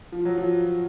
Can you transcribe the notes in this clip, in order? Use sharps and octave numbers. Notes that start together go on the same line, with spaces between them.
F3
F#3
F3